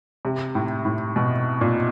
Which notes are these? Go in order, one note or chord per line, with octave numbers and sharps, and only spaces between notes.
C3
A2
A2
B2
A#2